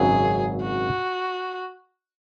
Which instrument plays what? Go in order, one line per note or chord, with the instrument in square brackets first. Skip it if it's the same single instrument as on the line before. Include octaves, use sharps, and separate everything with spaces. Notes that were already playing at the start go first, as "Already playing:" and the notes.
Already playing: [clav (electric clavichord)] G#1 F#2 C#3 F#3 [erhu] G#4
[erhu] F#4